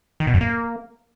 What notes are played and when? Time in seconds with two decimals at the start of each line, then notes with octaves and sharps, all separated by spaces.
0.20 D#3
0.27 B2
0.34 F#2
0.41 A#3